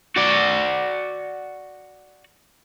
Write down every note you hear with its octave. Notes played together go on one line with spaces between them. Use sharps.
F#4 D5